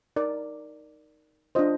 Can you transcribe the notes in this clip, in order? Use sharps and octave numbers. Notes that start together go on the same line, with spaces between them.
D#4 A#4 D5
D4 F4 C5 D#5